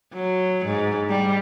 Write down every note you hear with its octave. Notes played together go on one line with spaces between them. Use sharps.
F#3
G#2
G3